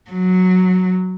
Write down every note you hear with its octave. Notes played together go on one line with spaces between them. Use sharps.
F#3